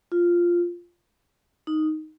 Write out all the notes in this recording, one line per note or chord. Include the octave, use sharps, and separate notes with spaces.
F4
D#4